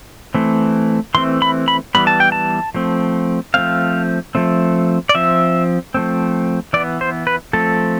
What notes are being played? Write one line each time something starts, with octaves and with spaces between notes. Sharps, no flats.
E3 A3 C4
E3 A3 C4 C6
B5
B5
E3 G3 B3 B5
A5
G5
A5
F3 A3 C4
F3 A3 C4 F5
F3 A3 C4
D5
F3 C4 E5
F3 A3 C4
E3 B3 D5
C5
B4
F3 A3 C4 A4